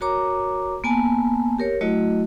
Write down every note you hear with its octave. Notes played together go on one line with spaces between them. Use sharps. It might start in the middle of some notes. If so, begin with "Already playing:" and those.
F#4 A#4 C#5 A#5 D6
A#3 B3 G#5 A5
G4 A#4 C#5
F#3 A3 E4 F#4 D#5